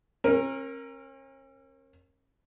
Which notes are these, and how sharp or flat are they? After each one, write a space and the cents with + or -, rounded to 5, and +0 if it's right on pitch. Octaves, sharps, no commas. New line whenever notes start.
C#4 -45 A#4 +0